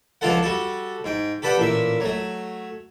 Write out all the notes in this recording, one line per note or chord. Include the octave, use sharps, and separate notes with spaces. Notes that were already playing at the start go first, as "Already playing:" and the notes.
C#2 F3 D4 F4 A4 F#5
G3 F#4 A4
G#2 G5
G4 A4 B4 D5 F#5 G5
A1 A#2 E5
F#3 A3